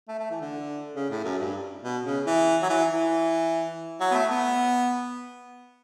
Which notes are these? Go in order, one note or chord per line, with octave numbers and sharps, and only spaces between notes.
A3
A3
E3
D3
C#3
A2
F#2
G2
B2
C#3
E3
F#3
E3
E3
F#3
B3
A3
B3